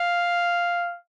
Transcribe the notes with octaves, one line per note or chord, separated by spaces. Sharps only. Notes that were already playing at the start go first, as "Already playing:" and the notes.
Already playing: F5